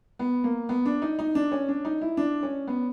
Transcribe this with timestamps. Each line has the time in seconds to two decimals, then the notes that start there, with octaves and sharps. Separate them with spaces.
0.19 B3
0.44 A#3
0.69 B3
0.86 D4
1.02 D#4
1.19 D#4
1.35 D4
1.52 C#4
1.68 D4
1.85 D#4
2.02 E4
2.17 D4
2.43 C#4
2.67 B3